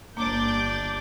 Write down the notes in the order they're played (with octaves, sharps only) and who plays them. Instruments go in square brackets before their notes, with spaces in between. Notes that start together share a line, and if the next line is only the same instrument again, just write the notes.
[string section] G1 D6 G6 [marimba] A#3 [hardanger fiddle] D4 D5